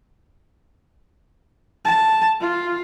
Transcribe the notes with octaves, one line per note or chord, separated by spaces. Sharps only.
A5
F4